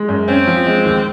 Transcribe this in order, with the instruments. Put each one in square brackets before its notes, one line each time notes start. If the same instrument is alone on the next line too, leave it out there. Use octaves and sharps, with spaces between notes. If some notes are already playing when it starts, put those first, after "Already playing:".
Already playing: [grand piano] G#3
F#2
[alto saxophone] C4 [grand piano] C#4
[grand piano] F3
G#3
D#2